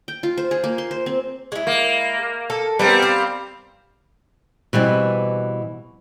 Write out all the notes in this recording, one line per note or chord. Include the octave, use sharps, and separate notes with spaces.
G5
F4
C5
G#4
A#3
C6
C5
C4
G#3 E4
A#3
A4
G3 B3 C4 A#4 F5
F5
B2 E3 G3 C4